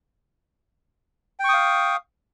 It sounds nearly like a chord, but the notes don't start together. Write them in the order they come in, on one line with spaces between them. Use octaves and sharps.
G5 C#6 D#6 F5